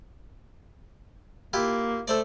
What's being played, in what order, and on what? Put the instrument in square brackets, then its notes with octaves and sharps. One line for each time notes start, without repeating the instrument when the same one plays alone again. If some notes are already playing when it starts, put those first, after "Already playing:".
[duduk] A#3 [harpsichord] E4 F4 G4
[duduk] A3 [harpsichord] A4 C5 D5